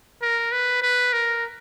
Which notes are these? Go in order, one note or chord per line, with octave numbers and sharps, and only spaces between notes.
A#4
B4
B4
A#4